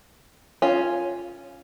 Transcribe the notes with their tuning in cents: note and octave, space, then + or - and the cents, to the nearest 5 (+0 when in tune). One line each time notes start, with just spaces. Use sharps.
C#4 +0 F4 +0